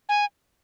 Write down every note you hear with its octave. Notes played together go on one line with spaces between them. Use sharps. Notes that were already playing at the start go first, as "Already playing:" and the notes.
G#5